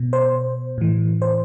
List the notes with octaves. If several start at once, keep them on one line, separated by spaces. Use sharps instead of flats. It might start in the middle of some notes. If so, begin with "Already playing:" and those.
Already playing: B2
C5
A2 E3
C5